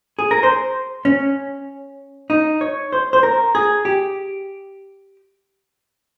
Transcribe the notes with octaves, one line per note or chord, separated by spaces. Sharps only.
G#4
A#4
C5
C#4
D#4
C#5
C5
C5
A#4
G#4
G4